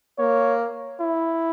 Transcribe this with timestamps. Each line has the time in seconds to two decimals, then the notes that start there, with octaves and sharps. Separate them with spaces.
0.19 A#3 C#5
1.00 E4